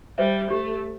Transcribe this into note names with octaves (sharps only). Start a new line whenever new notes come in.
G3 C5 E5
A3 G4